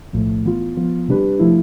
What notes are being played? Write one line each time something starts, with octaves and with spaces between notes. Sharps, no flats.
B1 A2 F3 A3
E3 B3 F4
F3 B3 F4
C3 G3 D4 G4 B4
F3 A3 E4